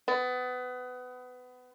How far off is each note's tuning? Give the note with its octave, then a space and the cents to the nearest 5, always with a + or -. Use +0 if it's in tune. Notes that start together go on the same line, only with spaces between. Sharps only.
B3 +25